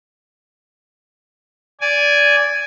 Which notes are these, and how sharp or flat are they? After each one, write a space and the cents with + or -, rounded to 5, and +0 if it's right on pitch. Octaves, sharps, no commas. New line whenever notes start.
D5 -15 G#5 +0